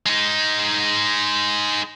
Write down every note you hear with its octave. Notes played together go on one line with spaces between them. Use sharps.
G#3 D#4